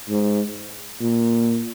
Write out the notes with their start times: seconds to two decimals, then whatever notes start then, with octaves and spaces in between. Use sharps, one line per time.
0.09 G#2
1.00 A#2